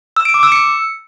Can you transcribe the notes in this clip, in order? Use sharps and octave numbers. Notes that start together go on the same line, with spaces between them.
E6
D7
D6
E6
C#7